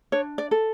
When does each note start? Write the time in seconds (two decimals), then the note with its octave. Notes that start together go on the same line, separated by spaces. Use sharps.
0.12 D4 C#5
0.38 D5
0.51 A4